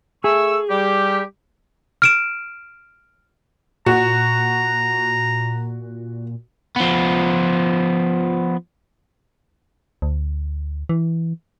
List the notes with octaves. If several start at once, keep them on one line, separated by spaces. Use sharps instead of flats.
A3 G#4 C#6 E6
G3 G4
F6 D7 E7
A#2 F#4 A#5
F3 B3
D2
E3